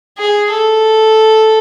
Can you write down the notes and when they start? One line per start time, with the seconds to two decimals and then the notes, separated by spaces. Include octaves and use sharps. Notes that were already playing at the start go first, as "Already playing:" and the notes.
0.18 G#4
0.50 A4